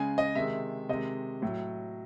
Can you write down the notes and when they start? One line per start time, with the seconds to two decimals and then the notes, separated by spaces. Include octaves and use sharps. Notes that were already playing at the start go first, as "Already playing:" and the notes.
Already playing: C#3 G#3 G#5
0.18 D#5
0.35 C3 D#3 G#3 E5
0.89 C3 D#3 G#3 D#5
1.42 A2 F#3